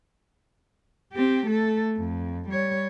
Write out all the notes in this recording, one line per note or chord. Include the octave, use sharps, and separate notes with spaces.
C4 G4
A3 A4
F2
G3 C#5